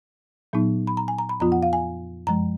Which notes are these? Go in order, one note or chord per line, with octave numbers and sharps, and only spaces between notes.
A#2 F#3 B3 D#4
B5
A#5
G#5
A#5
B5
F2 F3 B3 F4 A#5
F#5
F5
G#5
F#2 F3 G#3 A#5